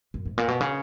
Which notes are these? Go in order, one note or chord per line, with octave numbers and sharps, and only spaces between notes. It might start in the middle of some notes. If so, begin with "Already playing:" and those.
F#2
G#2
A#2
B2
C#3